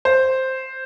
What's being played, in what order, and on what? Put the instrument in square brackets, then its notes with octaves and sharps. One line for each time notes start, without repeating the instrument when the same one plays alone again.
[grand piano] C5